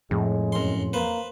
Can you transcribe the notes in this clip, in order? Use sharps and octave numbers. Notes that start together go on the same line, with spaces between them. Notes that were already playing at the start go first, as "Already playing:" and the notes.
F2 A2 G#3
F#2 C6
A#3 B4 C5